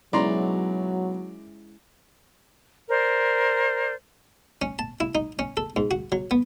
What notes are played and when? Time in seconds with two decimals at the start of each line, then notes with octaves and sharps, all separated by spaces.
0.13 B1 F#3 G#3 C#4 E4 D5 A#5 C6
2.89 A#4 C5 D5
4.62 C#4
4.79 A5
5.00 E4
5.15 D#4
5.39 C#4
5.57 A4
5.76 G#2
5.91 F#4
6.12 F#3
6.31 B3